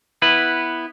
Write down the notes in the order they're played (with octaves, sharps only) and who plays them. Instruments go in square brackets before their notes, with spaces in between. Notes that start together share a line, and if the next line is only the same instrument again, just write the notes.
[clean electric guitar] B3 E4 B4